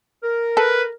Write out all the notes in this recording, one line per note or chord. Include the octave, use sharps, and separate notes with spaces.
A#4
A4 B4